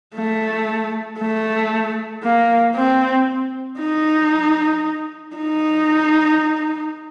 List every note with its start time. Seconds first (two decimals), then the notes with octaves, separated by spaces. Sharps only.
0.15 A3
1.19 A3
2.23 A#3
2.76 C4
3.80 D#4
5.36 D#4